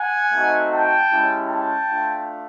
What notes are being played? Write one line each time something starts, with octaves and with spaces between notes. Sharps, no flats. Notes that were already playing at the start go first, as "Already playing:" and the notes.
Already playing: F#5 G#5
A3 C4 D#4 F#4
G5 A5
G#3 C#4 E4 G4
G5 A5
A3 D4 F4